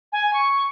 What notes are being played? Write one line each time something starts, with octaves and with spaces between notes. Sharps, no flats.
G#5
C#6